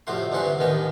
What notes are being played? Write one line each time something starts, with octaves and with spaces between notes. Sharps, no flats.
F2 A2 C3 F#4 C6
D2 G2 C3 E3 F#5 C6
A1 D#2 D#3 B3 D#6